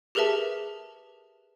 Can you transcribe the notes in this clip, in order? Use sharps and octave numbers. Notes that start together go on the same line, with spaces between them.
G4 G#4 A#4 B4 E5 A5